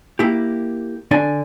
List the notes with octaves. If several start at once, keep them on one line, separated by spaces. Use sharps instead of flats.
A#3 E4 G4
D3 D4 D5 G#5